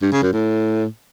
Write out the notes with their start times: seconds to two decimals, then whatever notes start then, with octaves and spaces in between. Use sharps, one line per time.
0.02 G2
0.12 C#3
0.23 F#2
0.33 A2